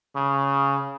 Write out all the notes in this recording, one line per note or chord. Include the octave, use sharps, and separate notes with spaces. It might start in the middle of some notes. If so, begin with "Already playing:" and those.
C#3